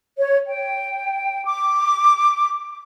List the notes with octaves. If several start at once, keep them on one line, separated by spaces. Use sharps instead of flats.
C#5
G5
D6